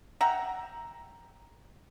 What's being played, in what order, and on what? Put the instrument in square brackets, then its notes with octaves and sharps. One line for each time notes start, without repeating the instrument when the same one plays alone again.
[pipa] E5 F#5 G5 A#5